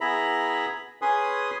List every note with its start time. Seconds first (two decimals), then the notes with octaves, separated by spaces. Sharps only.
0.01 B3 E4 G#4 E5 A#5 B5
1.02 C#4 G#4 B4 G#5 C6 D#6